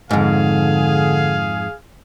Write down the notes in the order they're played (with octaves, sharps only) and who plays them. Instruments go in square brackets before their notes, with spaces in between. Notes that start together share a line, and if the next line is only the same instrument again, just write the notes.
[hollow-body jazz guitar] F2 G#2 [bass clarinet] D3 [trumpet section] G#4 F5